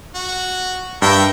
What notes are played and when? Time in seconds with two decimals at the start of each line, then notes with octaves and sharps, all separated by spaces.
0.15 F#4
1.02 G2 A#4 E5 G5